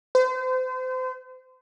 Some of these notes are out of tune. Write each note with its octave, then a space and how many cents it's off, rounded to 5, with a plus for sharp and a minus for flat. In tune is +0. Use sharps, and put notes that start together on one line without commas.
C5 -35